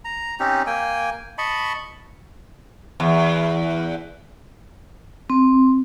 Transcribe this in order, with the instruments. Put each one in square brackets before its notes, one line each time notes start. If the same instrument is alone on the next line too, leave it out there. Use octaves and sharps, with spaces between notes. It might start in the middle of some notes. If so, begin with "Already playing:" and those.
[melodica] A#5
C4 C#4 D#4 G4
A#3 G5 G#5
D#5 A5 B5 C#6
[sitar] E2
[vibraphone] C4